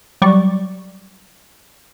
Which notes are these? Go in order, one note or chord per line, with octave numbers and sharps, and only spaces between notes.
F#3 G3 D5 C#6